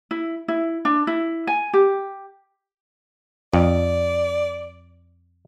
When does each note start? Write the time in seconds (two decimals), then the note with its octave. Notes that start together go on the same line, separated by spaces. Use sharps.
0.11 E4
0.48 E4
0.85 D4
1.07 E4
1.47 G#5
1.73 G4
3.53 F2 D5